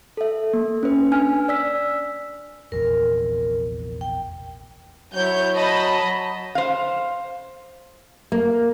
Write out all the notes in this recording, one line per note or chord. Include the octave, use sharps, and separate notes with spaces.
A4 E5
A#3
C#4 B4
D4 G#5 F6
D5 E6 B6
F1 A#1 E2 A#4
G5
F#3 E4 C#5 G6
D#5 A5 B5
C5 F5
A#3